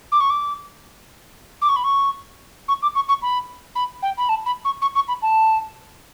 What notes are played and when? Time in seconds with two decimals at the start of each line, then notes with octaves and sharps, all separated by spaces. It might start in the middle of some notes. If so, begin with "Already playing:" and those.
0.12 D6
0.20 C#6
0.30 D6
1.62 D6
1.69 C#6
1.76 B5
1.84 C#6
2.68 C#6
2.82 D6
2.95 C#6
3.09 C#6
3.22 B5
3.75 B5
4.03 G5
4.18 B5
4.29 A5
4.46 B5
4.65 C#6
4.82 C#6
4.95 C#6
5.08 B5
5.22 A5